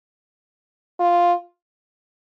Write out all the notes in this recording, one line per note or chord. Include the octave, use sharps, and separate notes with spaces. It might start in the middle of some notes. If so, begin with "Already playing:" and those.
F4